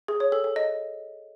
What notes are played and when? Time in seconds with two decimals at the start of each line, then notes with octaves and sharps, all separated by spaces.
0.08 G#4
0.20 C#5
0.32 A4
0.44 A4
0.56 D#5